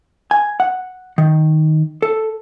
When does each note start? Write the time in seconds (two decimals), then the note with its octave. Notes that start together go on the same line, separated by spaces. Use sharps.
0.31 G#5
0.60 F#5
1.18 D#3
2.02 A4